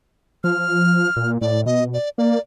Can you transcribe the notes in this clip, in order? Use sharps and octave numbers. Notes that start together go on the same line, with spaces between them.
F3 F6
A#2
A2 D5
B2 D#5
D5
A#3 D5